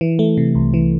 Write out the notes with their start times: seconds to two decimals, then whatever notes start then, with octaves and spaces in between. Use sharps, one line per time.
0.01 E3
0.19 A3
0.37 C3
0.55 C2
0.74 E3